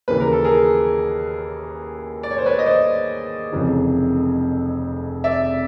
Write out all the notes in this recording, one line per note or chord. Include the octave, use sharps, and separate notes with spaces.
D#2 C#3 E3 B4
A#4
A4
G#4 A#4
D5
C#5
C5
B4 C#5
D#5
C5 D5
F1 F2 C#3 E3
D5 E5